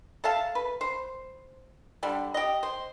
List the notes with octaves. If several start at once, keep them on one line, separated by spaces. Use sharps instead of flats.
A4 E5 F5 A5
B4
C5
D3 G3
G4 D#5
C5